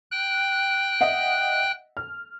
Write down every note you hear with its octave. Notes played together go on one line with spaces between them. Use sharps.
G5 F#6
D#5 E5 F#5
F6